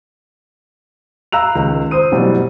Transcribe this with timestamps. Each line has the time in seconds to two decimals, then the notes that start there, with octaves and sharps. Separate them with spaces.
1.32 F5 A#5 B5 E6 F#6 F7
1.55 C#2 D#3
1.91 C5 D#6 D#7
2.12 B2 E3 F#3 G3